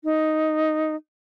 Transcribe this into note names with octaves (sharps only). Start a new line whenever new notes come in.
D#4